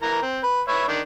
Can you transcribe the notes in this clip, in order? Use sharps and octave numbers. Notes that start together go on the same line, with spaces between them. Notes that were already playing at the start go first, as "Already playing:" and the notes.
E3 A#4 A#5
C4
B4
B4 C#5 E5
D#3 D4